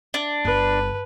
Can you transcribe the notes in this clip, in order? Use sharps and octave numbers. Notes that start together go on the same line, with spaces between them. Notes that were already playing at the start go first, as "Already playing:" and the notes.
D4
G1 B4